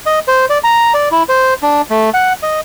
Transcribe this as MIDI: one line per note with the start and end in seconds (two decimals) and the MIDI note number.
0.06 0.19 75
0.28 0.46 72
0.50 0.58 74
0.64 0.93 82
0.94 1.09 74
1.12 1.23 64
1.29 1.54 72
1.63 1.82 62
1.90 2.10 57
2.14 2.33 78
2.43 2.61 75